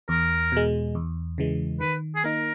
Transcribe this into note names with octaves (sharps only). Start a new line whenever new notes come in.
E2 A#4
B2 G#3
E2
C#3 E3 G#3
D#3 B4
G#4
A#3 D#4 A#4